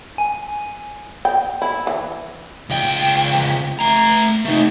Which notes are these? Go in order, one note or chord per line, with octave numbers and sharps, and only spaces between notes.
G#5
G5
E4
E3
C#2 G5
A3 A#5
A3 D#4